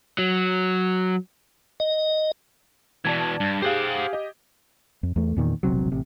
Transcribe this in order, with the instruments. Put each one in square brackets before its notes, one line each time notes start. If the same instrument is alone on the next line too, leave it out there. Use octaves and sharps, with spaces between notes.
[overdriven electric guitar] F#3
[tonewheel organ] D#5
[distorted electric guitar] B2 E3 [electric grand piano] D5 A5 G#6
[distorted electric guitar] G2
[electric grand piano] G4 G#4 F5 [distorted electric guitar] C5 F#5
[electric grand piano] G4 D#5
[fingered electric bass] F2
E2 A3
E2 A#2 D#3
E1 A#1 C3 F#3
A1 C3